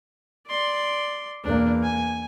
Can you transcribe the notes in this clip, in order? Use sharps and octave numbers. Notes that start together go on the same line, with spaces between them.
D5 C6
E2 A#3 D4
G#5